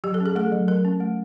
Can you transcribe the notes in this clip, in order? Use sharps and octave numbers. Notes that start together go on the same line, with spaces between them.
F#3 G4
A4
C#4
G#4
A3 A4
F#3
F#3 A#4
C#4
A3